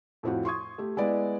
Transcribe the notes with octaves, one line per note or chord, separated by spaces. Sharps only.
F2 A2 C4 F4 F#4
C6 C#6 D#6 G#6
A3 G4
G#3 B3 E4 D5